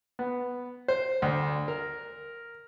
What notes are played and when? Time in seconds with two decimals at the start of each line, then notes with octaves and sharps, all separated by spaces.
0.19 B3
0.88 C5
1.22 D2
1.68 A#4